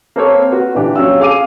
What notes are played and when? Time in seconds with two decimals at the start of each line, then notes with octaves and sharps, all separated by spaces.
0.16 A#3 C4 A4 C5 C#5
0.51 F#4 B4
0.75 A#2 D3 E3 D4 G4
0.96 F#3 C#4 F5 E6
1.20 G#4 F5 D6 D#7